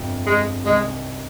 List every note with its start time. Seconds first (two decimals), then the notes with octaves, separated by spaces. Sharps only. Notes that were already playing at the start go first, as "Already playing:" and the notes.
Already playing: G1 F2 C3 F3
0.26 G#3
0.65 C2 C3 D#3 G#3